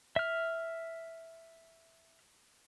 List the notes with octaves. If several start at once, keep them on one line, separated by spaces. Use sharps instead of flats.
E5 F6